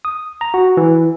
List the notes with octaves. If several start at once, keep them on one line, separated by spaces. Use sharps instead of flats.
D#6
A#5
F#4
E3